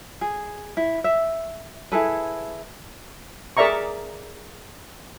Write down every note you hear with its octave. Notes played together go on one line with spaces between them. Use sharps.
G#4
E4
E5
E4 G#4 A4 B4
G#4 A#4 D5 E5 A#5 C#6